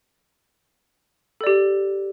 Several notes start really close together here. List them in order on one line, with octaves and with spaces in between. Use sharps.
A4 D5 G4